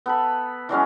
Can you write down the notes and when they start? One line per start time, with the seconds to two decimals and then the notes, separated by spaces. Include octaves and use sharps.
0.06 B3 A4 B5
0.69 E3 F#3 G#3 C#4